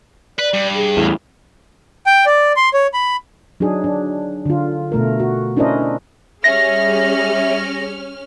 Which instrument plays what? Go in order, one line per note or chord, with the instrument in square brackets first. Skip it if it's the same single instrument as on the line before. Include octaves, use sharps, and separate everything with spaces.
[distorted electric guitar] B4 [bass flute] D5
[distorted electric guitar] G2
[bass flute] G#4
[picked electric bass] E2 A2
[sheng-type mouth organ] G5
D5
C6
C#5
B5
[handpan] F#3 D4 D#4 G#4
D4
D3 F4
B2 A3 A#4
F#4
C#4 D4 E4 A#4 C5 D#5
[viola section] G3 G#4 [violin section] C#4 F6 [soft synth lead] E5 [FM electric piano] A#6